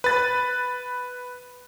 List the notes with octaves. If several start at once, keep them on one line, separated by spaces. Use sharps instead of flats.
B4 A6